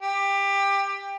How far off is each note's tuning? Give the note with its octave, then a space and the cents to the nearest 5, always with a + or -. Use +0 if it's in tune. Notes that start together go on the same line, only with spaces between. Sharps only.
G4 +20